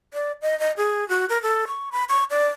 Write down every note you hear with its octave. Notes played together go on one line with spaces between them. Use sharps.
D5
D#5
D#5
G#4
F#4
A#4
A4
C#6
B5
C#6
D5